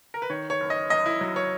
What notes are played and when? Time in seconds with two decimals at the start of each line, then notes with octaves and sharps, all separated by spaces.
0.14 A#4
0.22 B4
0.30 D#3 C#5
0.50 C#5
0.60 F#1
0.70 D#5
0.90 F#2 D#5
1.06 E4
1.21 F#3
1.36 C#5